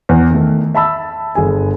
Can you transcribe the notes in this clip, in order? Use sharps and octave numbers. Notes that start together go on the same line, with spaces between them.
E2
D#3 A3
E5 A5 B5 E6
G1 G#4 G#5